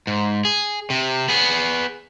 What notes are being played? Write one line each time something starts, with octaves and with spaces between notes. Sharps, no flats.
G#2
G#4
C3
B3 G#4